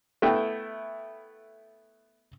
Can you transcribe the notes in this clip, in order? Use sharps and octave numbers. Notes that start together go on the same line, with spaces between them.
A3 B3 E4 G5